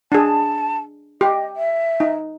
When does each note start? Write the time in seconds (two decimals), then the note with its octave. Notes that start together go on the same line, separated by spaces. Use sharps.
0.12 D4 G#4 A5
1.21 G4 D#5
1.56 E5
2.00 D#4